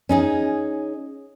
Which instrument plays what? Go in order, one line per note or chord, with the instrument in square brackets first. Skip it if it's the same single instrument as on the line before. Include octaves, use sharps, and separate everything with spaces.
[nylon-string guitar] C#4 D#4 G#4